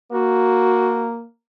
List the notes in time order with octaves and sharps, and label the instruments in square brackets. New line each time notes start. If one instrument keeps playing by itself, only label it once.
[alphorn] A#3 [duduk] F#4